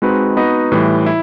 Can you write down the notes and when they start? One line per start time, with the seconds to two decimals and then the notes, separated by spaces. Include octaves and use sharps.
0.02 G#3 C4 D#4 F#4 B4
0.37 B3 D#4 F#4 B4 D#5
0.72 A2 E3 G3
1.06 E4